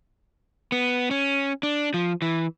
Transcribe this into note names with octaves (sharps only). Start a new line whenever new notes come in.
B3
C#4
D4
F3
E3